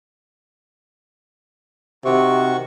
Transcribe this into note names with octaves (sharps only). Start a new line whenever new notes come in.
C3 D#3 F#4 C#6